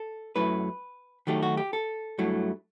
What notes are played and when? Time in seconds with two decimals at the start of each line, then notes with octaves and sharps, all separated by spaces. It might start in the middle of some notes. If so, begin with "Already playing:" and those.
Already playing: A4
0.36 F#2 F#3 A3 E4 B4
1.27 D#3 F#3 A3 D#4 G4
1.42 F#4
1.57 G4
1.73 A4
2.18 G2 F#3 A3 E4